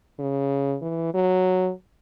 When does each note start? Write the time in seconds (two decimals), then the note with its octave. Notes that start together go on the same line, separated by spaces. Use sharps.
0.20 C#3
0.82 E3
1.14 F#3